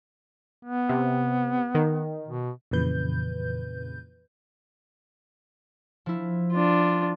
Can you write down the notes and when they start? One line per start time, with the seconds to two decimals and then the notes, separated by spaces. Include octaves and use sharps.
0.65 B3
0.89 C3
1.75 D#3
2.28 B2
2.71 F2 A#2 C#3 E3 B4 G6
6.06 F3 E4
6.52 D4 F4